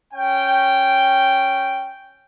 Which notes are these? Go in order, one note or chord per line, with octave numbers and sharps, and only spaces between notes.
C#4 G5